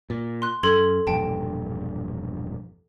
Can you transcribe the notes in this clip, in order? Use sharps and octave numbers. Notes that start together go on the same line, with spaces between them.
A#2
C6 F#6
F#2 A4 C6 G#6
E1 A#1 G2 G5 A5